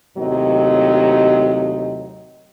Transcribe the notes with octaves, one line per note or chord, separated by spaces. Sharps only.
D#2 A2 C3 F#3 D#5